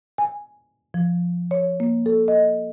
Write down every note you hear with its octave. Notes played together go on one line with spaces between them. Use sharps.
G#5
F3
C#5
A#3
A4
D#5